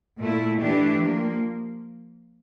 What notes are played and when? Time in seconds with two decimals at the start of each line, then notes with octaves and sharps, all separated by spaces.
0.18 A#2 A3 E4
0.60 E3 A3 D4 G4
1.01 F3 A#3